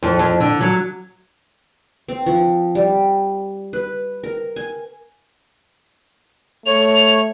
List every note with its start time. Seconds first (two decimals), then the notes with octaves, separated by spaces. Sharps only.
0.03 F2
0.19 F2
0.40 D3
0.61 F#3
2.08 C4
2.26 F3
2.75 G3
3.73 B4
4.23 A#4
4.56 G#5
6.66 A3 C#5 F7